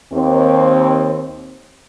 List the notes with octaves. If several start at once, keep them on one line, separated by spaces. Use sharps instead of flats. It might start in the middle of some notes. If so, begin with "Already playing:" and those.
D#2 C4